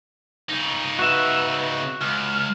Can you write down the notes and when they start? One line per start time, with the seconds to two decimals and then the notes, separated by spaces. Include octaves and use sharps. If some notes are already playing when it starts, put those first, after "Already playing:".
0.49 C#3 D#4
0.99 F#4 B4 E5
2.01 C#2 F6